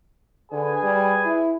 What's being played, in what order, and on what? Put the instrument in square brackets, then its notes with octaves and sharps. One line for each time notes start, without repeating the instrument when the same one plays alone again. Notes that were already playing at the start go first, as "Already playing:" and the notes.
[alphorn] D3 [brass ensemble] G#4 B4 G#5
[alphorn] G3
E4